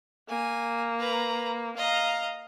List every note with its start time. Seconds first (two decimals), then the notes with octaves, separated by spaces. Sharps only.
0.29 A#3 G#5
0.99 B4 A#5
1.77 D#5 F5 A#5